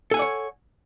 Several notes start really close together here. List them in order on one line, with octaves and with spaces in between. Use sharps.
A4 G#5 F#5 D5 C#5